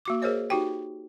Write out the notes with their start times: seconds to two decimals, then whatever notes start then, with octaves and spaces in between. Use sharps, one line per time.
0.05 A#3 F#4 D6
0.22 G#4 A#4 C5 C#5 D#5
0.50 D#4 F#4 G4 G5